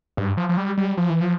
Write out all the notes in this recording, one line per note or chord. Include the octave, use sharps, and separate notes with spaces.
G2
F3
F3
G3
G3
F3
E3
F3